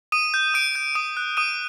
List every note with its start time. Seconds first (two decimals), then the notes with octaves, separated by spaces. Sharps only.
0.12 D#6 D#7
0.34 G6
0.54 D#6 D7
0.75 G6
0.95 D#6 D7
1.17 F#6
1.37 D#6 D#7